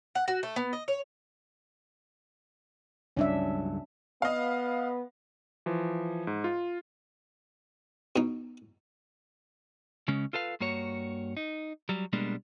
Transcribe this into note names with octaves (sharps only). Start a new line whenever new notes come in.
F#5
F#4
A3
B3
D#5
C#5
C#2 G2 F#3 C#4 D4 E5
B3 D#5 F5
E3 F3
G#2
F4
B2 D#4
C#3 G#3 C#4
F4 A4 B4 F5
G2 A#3 F#4 C#5
D#4
F#3 G3
B2 G3 G#3 A#3 D4